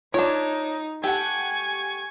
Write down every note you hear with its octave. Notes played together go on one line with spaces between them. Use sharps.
D4 D#4 F4 C#5 G#6
G4 A4 F#5 G#5 C#6